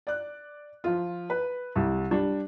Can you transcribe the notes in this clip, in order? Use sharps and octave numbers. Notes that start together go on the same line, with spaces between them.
D5 F#6
F3 F4
B4
C2 G3
G3 D4